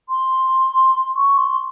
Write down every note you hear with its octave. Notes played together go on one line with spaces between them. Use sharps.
C6
C#6
C6